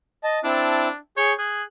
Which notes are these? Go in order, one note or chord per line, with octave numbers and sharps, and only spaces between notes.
D#5 A5
C4 D4 E4 A5
G#4 C#5 C#6 G6
G#4 F#6